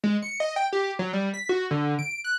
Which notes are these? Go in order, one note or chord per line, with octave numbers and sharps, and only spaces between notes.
G#3
C#7
D#5
G5
G4
F#3
G3
B6
F#4
D3
D7
F#6